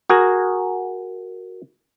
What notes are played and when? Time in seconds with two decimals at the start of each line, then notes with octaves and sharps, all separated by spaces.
0.09 F#4 G#4 A#4